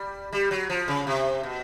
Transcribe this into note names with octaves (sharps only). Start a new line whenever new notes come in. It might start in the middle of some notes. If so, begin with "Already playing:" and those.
Already playing: G3
G3
F#3
F3
C#3
C3
B2